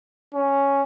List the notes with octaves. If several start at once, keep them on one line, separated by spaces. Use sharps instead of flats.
C#4